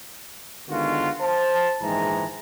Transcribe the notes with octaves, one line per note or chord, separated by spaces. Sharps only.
D3 D#3 G#3 B3 F4 F#4
C5 A5
A#1 G#2 D#3 E3 G#3 A#5